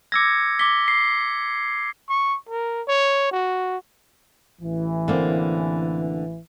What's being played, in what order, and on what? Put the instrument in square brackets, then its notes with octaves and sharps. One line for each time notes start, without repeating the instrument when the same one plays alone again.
[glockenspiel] D6 E6 A#6 [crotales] G#6 C#7
[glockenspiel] D6 G7 [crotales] B6
[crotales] C7
[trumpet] C#6
A#4
C#5
F#4
[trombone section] A1 E3
[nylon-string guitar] D3 A#3 C4